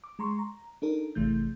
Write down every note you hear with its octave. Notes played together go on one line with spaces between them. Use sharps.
D6
G#3 A#5 C6 C#6
A#5
D4 D#4 A4 A#4
G#1 C3 E3 A3 G6